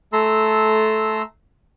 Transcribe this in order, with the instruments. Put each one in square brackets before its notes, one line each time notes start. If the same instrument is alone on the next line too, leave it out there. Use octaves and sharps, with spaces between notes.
[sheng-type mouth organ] A3 A4 A#5 C6 E6